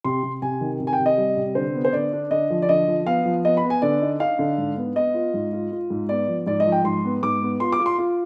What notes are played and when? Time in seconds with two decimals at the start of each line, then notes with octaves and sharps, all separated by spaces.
0.05 C3 C6
0.23 C3
0.42 C3 G#5
0.61 D#3
0.80 C3
0.87 G#5
0.93 G5
1.00 C3
1.06 D#5
1.18 G3
1.37 C3
1.55 D3 C5
1.75 B3
1.85 C5
1.93 D3 D5
2.12 D4
2.31 D3 D#5
2.50 F3
2.62 D5
2.69 D3 D#5
2.88 F3
3.06 B3 F5
3.26 F3
3.45 B3 D#5
3.57 B5
3.63 B3
3.70 G#5
3.82 D3 D5
4.02 D#4
4.20 D#4 F5
4.39 D3
4.58 G#2
4.77 B3
4.96 B3 D#5
5.14 F4
5.34 G#2
5.53 F4
5.71 F4
5.90 G#2
6.09 B3 D5
6.28 F3
6.47 G#2 D5
6.60 D#5
6.66 F3
6.72 G5
6.84 G#2 C6
7.04 B3
7.23 G#2 D6
7.42 B3
7.60 F4 C6
7.72 D6
7.79 F4
7.86 C6
7.98 F4